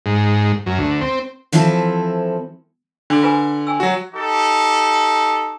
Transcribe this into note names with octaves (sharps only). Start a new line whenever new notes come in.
G#2
F#2
D2
C4
E3 F3 C4 E4 A4
D3 D4 A4
F4 B4 G#5
G5 G#5 E6
F#3 F#4
D#4 G4 A4